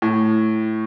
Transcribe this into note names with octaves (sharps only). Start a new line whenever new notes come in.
A2